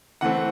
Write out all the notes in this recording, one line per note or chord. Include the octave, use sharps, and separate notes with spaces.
E3 A3 C4 F#5